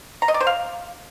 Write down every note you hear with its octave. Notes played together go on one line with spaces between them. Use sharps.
A#5
D#5
D5
C5
F5